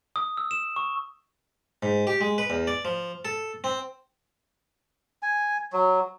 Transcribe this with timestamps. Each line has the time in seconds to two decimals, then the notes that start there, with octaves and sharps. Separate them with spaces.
0.16 D#6
0.37 E6
0.51 E7
0.76 C#6
1.83 G#2
2.07 G4
2.21 G#3
2.38 B4
2.50 E2
2.67 D5
2.85 F3
3.25 A4
3.64 C4
5.23 G#5
5.73 F#3